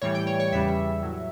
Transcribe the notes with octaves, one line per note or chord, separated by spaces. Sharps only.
A2 E3 G3 C#5
G5
C#5
C#5
E2 C#3 E3 G3 E5
A2 F#3